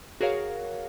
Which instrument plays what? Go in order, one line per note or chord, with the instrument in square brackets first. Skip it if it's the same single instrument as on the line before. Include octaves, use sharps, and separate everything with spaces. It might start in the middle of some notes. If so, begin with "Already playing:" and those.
[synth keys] F#4 G#4 A#4 C#5 F5